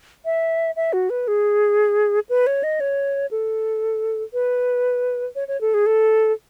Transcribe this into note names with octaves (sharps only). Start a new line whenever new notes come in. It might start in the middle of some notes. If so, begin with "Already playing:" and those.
E5
E5
F#4
B4
G#4
B4
C#5
D#5
C#5
A4
B4
C#5
C#5
A4
G#4
A4